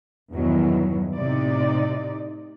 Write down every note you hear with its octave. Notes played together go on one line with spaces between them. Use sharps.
E2 G2 B2 D#3 E3 F#3
A2 C3 D#4 D5